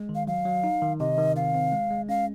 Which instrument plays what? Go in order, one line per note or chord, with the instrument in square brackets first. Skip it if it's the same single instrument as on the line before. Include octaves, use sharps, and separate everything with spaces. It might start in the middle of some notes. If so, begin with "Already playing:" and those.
Already playing: [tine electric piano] G#3
D#3
[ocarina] F5
[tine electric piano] F#3 [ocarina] F5
[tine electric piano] F#3
D#4
D#3
[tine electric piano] C3 [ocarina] D#5
[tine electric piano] D#3
[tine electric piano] C4 [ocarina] F5
[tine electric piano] C4
G#3
G#3
[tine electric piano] C#4 [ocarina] F5